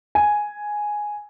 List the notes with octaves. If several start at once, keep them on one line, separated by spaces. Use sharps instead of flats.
G#5